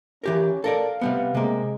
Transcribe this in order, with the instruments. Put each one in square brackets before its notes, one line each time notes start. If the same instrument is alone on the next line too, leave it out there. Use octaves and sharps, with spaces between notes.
[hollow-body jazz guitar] E3 G4 A#4 [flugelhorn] C#4
[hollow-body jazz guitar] A4 A#4 D5 [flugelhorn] F5
[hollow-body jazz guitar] C3 G3 B3
[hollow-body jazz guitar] C3 A#3 [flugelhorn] G#3